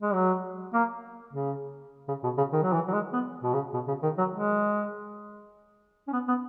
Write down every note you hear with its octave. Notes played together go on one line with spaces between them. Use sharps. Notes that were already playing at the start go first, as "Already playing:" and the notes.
G#3
F#3
A#3
C#3
C#3
B2
C#3
D#3
F#3
E3
F#3
G#3
B3
B2
C#3
B2
C#3
D#3
F#3
G#3
C#4
B3
B3